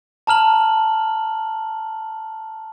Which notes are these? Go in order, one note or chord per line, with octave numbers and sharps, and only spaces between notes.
A5 A#5 F6 F#7